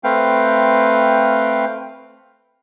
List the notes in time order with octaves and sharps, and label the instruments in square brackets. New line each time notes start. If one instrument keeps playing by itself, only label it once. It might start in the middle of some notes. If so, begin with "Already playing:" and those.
[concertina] A3 C4 B4 F5 G5